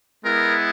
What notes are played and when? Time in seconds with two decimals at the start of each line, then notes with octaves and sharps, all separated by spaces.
0.23 G#3 B3 E4 A#4